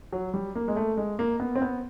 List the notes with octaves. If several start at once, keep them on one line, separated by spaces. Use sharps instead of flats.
F#3
G3
A#3
G#3
A3
G#3
A#3
B3
C4
B3